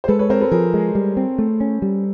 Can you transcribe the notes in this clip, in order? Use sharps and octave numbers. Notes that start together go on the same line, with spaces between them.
C5
G#3 A4 B4
B4 C#5
C4 A#4 C5
A4 B4
F3 G#4 A#4
G#3
G3
C4
A3
C#4
G3